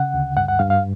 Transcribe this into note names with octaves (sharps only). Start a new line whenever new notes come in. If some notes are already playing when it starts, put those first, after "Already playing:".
Already playing: C#3 F#5
D2
G2 F#5
F#5
G2 F5
F5